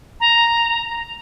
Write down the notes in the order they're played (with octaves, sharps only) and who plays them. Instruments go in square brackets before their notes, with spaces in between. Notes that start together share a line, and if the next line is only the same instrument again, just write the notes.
[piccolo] A#5